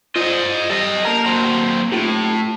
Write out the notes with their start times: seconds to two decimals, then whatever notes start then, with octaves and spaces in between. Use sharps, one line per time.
0.16 F4 C5 D5 D#5
0.70 G3 A4 D#5
1.05 A#3 A#4 A5 A#5
1.26 F#3 C4
1.92 A2 D#4 F4 G4